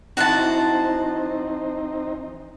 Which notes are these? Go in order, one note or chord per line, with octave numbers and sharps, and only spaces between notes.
F2 E3 C4 D#4 F#4 C5 A5